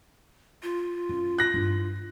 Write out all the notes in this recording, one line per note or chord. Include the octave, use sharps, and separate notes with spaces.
F4
F#2
F#6 A#6
G2 E4